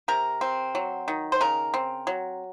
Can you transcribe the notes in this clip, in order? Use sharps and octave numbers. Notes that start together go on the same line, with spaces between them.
C3 A#4
C4
F#3
D#3
C5
C#3 A#4
C4
F#3